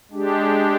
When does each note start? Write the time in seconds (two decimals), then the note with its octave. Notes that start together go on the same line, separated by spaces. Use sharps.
0.11 G#3 D4 G4